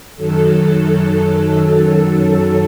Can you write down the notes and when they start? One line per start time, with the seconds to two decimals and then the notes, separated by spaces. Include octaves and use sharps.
0.16 F#2 D#3 F#3 A4